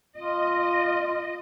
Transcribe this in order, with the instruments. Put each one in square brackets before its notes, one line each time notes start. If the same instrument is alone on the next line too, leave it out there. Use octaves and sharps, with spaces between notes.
[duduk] F4 [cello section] D#5